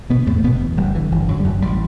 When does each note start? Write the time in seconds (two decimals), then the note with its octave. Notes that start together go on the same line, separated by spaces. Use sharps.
0.10 B2 D3 B3
0.26 E2 A2 A3
0.44 F#1 B2 B3
0.61 E2
0.77 F#1 G2 G3
0.95 D3 E3
1.11 F#1 E3
1.28 F#2 D3 F#3
1.40 G3
1.44 F#1 F#2 F#3
1.61 A1 G3